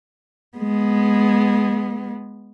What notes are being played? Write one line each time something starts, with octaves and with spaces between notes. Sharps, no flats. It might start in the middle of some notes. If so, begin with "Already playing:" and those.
G#3 B3